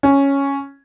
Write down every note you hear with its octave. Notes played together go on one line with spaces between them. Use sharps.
C#4